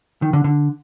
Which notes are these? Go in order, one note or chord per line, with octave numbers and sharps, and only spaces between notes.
D#3
D3
D3